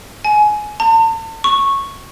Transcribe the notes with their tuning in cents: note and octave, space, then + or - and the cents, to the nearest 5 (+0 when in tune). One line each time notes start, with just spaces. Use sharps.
G#5 +20
A5 +40
C#6 -10